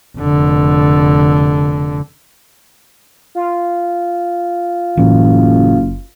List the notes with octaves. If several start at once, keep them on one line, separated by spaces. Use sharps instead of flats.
F1 D3
F4
F#1 A2 E3